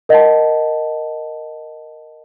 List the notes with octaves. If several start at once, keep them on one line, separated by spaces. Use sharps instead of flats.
A#4 D#5 F#5 A5